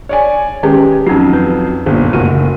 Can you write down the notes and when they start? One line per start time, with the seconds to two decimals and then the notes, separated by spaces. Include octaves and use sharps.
0.09 C#5 D5 G#5
0.63 D#3 G#3 C#4 G4 B4
1.07 F2 F#3 C#4 D#4
1.33 B4
1.86 G1 A#2 C5
2.13 F#1 A3 F#4 D#7